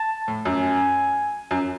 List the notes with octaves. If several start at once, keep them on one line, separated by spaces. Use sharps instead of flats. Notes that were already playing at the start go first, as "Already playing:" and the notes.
Already playing: A5
A2
F#2 G#5
F#2